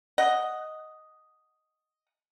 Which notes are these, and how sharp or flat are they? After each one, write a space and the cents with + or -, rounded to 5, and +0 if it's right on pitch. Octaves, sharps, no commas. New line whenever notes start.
D#5 +0 F#5 +0